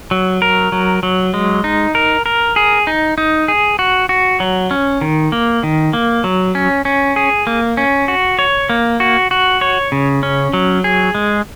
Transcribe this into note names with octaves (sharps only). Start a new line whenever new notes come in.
F#3
A#4
F#3
F#3
G#3
D#4
A#4
A#4
G#4
D#4
D#4
G#4
F#4
F#4
F#3
C#4
D#3
A#3
D#3
A#3
F#3
C#4
C#4
G#4
A#3
C#4
F#4
C#5
A#3
F#4
F#4
C#5
C#3
C#4
F#3
G#4
G#3